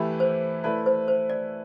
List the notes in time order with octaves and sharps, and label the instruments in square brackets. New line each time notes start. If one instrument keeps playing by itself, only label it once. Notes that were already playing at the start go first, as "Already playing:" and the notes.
Already playing: [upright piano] E3 A3 E4 G4 B4
[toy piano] C5
[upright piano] A3 E4 B4 [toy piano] D5
[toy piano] C5
C5
D5